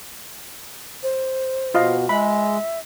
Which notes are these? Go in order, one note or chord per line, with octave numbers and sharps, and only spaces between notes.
C5
B2 F4 D#5 F5
G#3 E5 B5